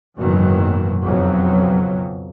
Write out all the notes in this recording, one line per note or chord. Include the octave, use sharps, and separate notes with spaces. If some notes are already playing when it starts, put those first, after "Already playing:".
F#1 G#2 B2 D#3 E3 F#3
B1 F2 C#3 F#3